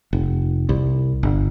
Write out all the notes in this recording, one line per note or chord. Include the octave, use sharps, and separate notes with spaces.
F1
C2
G1